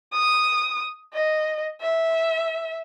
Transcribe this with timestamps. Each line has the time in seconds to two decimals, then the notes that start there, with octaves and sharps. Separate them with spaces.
0.13 D#6
1.13 D#5
1.81 E5